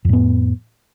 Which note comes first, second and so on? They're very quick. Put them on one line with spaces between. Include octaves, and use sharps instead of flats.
F2 A2 B3